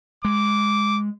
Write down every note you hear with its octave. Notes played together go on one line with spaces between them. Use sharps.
G#3 D6